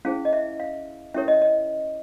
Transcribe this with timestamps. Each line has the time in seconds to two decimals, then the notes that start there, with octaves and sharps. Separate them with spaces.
0.05 C#4 E4 G#4 C5 F5
0.25 D#5
0.33 E5
0.60 F5
1.14 C#4 E4 G4 A#4 C#5 E5
1.28 D#5
1.42 D#5